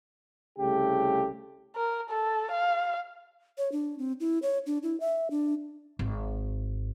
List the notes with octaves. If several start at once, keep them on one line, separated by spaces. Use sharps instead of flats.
C2 C#3 A3 G4
A#4
A4
F5
C#5
D4
C4
E4
C#5
D4
E4
E5
D4
G#1